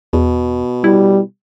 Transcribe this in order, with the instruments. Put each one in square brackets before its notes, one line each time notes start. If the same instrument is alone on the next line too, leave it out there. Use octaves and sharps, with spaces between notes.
[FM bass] E2 [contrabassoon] B2
[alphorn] G3 [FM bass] E4